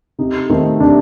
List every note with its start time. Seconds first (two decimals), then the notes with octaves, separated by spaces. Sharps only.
0.19 C3 D#4
0.49 D#3 A3 C4 D#4
0.80 C3 D4